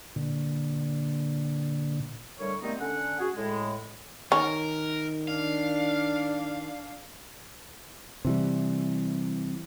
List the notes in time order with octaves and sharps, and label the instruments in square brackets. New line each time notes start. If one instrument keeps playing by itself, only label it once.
[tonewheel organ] A#2 D3
[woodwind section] A2 D3 G3 A#4 C#5
D#3 G3 A3 B3 C4 D#4
D3 C#4 F#5
F#4 G#4
A2 G#3
[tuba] D#3 [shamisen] C#4 [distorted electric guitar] A#4
[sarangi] D4 [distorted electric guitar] F5
[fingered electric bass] C3 E3 G3